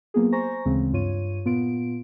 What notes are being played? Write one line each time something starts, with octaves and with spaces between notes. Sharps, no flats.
F#3 A#3 B3 F4 G#4
C5 G#5 A#5 C#6 A#6
D2 C#3 E3 G#3 C4
G2 F4 C#5 D#7
A#2 B3 F4 D7